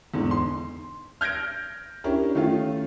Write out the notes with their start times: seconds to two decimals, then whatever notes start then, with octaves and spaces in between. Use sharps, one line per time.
0.14 E2 G#2 D3
0.31 C6
1.21 F6 G6 G#6 A#6 D7
2.04 C#4 D4 E4 G4 A#4
2.35 D#3 A3 C#4 F4 F5